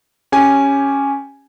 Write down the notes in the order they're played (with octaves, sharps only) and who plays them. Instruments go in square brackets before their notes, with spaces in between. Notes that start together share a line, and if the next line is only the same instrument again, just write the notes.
[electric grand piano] C#4 G4 G#5